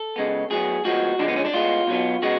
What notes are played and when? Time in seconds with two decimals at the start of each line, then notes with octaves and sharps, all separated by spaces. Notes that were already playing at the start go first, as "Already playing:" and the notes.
Already playing: A4
0.16 C#3 G#3 B3
0.51 A2 F#3 B3 G#4
0.85 A2 F3 G#3 B3 F#4
1.19 D3 F3 G#3 D4
1.28 B3
1.36 C#4
1.45 D4
1.54 A2 G#3 B3 F4
1.87 B2 F#3 B3
2.22 C#3 G#3 B3 F#4